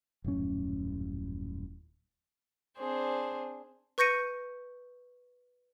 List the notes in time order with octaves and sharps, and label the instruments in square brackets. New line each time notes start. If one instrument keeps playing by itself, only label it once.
[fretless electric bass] D#1 F#2 A2 C#4
[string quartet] C4 D4 G#4 C5
[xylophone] B4 C#6 G6 A#6 C#7 D#7